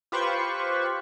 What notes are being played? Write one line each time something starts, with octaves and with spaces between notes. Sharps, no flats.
F4 G4 B4 C5 B5 C#6